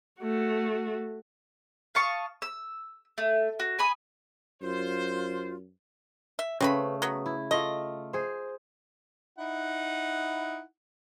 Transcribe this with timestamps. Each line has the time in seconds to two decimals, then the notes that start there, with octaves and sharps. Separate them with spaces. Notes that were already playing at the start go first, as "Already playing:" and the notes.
0.22 A3 F#4
1.95 F5 A5 C#6 D#6
2.42 E6
3.18 A3
3.60 F#4
3.79 G#5 B5 D#6
4.62 F#2 F4 C5
6.39 E5
6.60 C#3 A3 C4 B4 B5
7.02 F#3 B3
7.26 E4
7.51 A3 F4 D#5
8.13 G#4 C5
9.38 D#4 E4 F#5